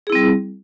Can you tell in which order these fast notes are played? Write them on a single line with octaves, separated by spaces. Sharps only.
G#4 E4 C4 G3